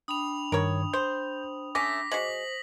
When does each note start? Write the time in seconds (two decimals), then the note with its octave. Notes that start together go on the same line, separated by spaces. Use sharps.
0.08 D4 G5 B5 D#6 F7
0.52 G2 D#3 A#4 C#5
0.93 C5 G6
1.75 A3 C#4 D6 A#6 B6
2.12 G#3 F#4 C5 B6 F#7